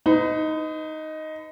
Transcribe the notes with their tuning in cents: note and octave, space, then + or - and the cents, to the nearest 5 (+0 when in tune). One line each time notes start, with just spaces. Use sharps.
D#4 +5 B4 +45